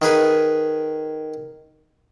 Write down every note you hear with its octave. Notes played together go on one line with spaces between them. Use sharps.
D#3 G#4 B4 G#5